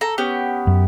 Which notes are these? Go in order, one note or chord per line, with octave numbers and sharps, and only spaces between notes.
A4 A#5
B3 C#4 G4
F#2